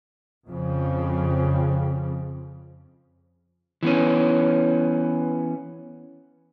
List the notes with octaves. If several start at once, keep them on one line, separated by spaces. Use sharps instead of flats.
F2 C#3 F3
E3 B3 C#4